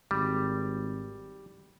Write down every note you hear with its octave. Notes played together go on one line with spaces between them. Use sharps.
G#1 G3